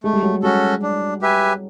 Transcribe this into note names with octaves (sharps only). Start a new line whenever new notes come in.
G#3 A3
G3
F#3
G3
G#3 C#4 F#4 A4
D4
G4 B4 E5 G#5